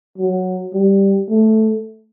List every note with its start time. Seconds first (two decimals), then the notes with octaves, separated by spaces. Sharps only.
0.18 F#3
0.73 G3
1.30 A3